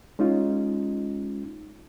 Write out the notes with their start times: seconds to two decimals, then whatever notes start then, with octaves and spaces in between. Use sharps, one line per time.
0.19 G#3 C#4 D#4 F4